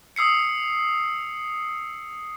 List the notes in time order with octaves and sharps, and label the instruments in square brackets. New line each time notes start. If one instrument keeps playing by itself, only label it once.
[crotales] D#6 E6 C7 C#7